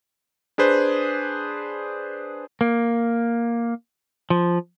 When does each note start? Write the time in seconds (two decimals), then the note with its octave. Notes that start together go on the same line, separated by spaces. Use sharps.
0.58 D4 G#4 B4 C5
2.61 A#3
4.30 F3